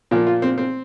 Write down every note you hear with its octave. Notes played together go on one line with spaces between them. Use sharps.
A#2 F3 A#3
F4
C4
C4